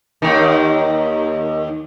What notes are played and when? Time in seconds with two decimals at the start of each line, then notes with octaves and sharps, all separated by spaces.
0.22 D#2 D#3